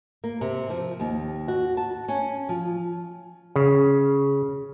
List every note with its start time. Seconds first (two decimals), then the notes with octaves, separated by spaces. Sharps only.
0.24 A#3
0.41 C3
0.70 F3
1.00 D#2
1.48 F#4
1.77 A5
2.08 C#4
2.49 F3
3.56 C#3